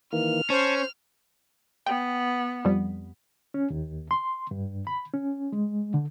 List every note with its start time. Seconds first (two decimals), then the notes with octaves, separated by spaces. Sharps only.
0.13 D#3 E3 A#3 F6
0.50 C#4 C5 A5 C#6
1.87 B3 G5
2.65 F2 G3
3.54 C#4
3.70 D#2
4.11 C6
4.51 G2
4.87 B5
5.14 C#4
5.52 G#3
5.94 D3